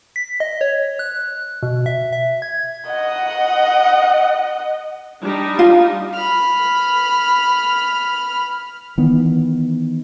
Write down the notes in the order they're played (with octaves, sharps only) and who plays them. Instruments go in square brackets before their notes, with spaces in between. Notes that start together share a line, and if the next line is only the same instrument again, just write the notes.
[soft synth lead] B6
D#5
C#5
F#6
B2
E5
E5
G#6
[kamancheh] D#5 F#5
[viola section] G3 D4 D#4
[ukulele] F4
[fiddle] B5 F6
[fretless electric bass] D#3 E3 B3